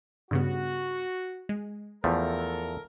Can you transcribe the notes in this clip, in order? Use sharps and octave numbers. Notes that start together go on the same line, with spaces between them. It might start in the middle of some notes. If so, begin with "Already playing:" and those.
G2 C#3 B3 F#4
G#3
E2 F3 A3 A4 A#4